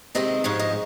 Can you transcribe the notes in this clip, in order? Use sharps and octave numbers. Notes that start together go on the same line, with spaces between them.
C3 D#3 G#3 C4 D#5
G#2 F3 G#3 C#5
D#5